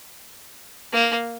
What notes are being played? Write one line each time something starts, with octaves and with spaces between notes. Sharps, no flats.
A#3